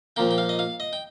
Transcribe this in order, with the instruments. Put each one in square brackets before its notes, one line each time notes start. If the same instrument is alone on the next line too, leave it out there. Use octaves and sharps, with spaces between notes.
[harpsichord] A#2 F3 A#3 G5
G5
F5
D#5
F5
D#5
G5